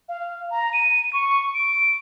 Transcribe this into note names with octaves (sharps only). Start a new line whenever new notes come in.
F5
A#5
D#7
C#6
D7